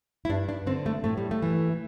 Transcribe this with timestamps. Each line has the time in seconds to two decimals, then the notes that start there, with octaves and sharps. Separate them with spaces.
0.25 E4
0.29 G2 D4
0.49 D4
0.67 D3 C4
0.86 A3
1.04 A2 A3
1.17 G3
1.31 A3
1.42 E3